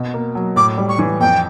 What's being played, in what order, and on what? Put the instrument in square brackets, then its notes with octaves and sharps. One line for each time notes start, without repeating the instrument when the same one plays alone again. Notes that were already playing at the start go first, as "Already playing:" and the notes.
Already playing: [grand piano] B2
A#3
F#3
[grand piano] A2 [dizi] D6
[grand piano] G3
[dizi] C#6
[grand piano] E3
[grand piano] F2 [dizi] G5